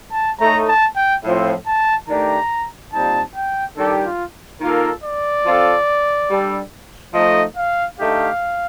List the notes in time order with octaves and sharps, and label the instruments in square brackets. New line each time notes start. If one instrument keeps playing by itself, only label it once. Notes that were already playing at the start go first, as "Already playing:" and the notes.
[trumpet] A5
[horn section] A2 A3 D#4 [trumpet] A#5
[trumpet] A5
G5
[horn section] A2 F3 C4
[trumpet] A5
[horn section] D#3 A3 D4 G4 [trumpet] A#5
[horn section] A#2 G3 C4 D#4 [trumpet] A5
[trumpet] G5
[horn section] D#3 G3 D4 G4 [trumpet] A4
[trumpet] F4
[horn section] D#3 A#3 F4 A4 [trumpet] A#4
[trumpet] D5
[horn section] F3 C4 F4 A4
G3 D4 A4
[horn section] F3 A3 D#4 [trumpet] D#5
[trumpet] F5
[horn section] D3 A3 D#4 G4 [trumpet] F5